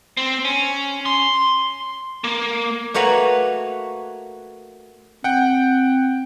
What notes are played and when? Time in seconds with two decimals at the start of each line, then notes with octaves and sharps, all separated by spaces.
0.17 C4
0.45 C#4
1.06 C6
2.24 A#3
2.94 A3 A#3 F#4 B4 C#5
5.24 C4 F#5 G5